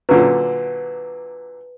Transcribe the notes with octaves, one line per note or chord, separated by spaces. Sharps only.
A#2 D3 F#3 B4